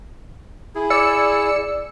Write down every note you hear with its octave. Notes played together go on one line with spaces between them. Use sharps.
E4 G#4
D5 E6 C#7